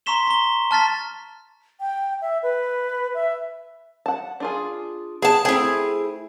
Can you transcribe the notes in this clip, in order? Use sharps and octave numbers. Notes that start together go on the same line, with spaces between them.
A#5 C6 C#6 B6 E7 G7
A#5 G7
A5 F6 A6 B6
G5
E5
B4
E5
F#5 A5
D4 F4 G#4
B3 G#4 G5 A5
A3 C4 E4 G#4 G5